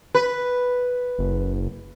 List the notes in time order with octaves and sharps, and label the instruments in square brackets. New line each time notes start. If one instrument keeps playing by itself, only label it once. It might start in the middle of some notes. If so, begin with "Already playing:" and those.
[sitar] B4
[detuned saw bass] F#1